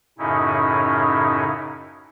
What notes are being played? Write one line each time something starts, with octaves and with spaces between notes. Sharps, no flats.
F#2 A2 C#3 C#4 D#4 E4